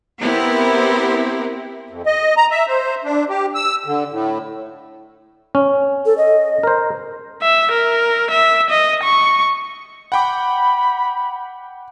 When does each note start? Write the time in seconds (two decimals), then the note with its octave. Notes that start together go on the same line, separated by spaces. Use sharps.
0.21 B3 C4 E4 G4 A#4 C5
1.90 F2
2.06 D#5
2.37 A#5
2.51 E5
2.68 C5
3.04 D4
3.29 G4
3.55 E6
3.86 D3
4.12 A2
5.55 C#4
6.06 A4
6.18 D#5
6.63 A#4 C5
7.42 E5
7.71 A#4
8.31 E5
8.70 D#5
9.03 C#6
10.12 F#5 G5 B5 D6